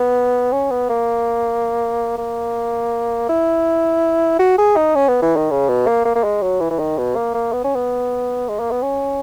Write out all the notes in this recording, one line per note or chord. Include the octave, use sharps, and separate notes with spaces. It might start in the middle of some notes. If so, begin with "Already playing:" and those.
Already playing: B3
C#4
B3
A#3
A#3
E4
F#4
G#4
D#4
C#4
B3
E3
D#3
C#3
B2
A#3
A#3
A#3
G#3
F#3
E3
E3
D#3
B2
A#3
A#3
B3
C#4
B3
G#3
A#3
B3
C#4